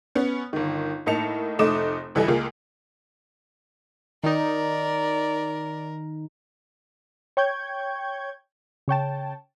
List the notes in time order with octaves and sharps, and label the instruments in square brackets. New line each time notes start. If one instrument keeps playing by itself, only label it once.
[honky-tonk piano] B3 C#4
G1 D#3
A2 A#3 D#4 A5 C#7 F7
F1 A3 D#4 D6 D#6 E7
C#2 E3 G3 A4 D#5 G#5
C#2 A#3 F4 G#4
[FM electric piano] D#3 D#4 [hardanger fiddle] A#4 [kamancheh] D5
[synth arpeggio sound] C#5 G5 C#6 G6 G#6
C#3 C#5 G5 A5